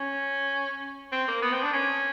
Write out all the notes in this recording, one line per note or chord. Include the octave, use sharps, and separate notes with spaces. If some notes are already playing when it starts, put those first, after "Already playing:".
Already playing: C#4
C4
A#3
B3
C4
D4
C#4